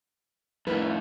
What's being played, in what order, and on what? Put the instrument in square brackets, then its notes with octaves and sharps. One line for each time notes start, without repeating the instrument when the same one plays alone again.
[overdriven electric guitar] F2 A2 [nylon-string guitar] E4 A#4 B4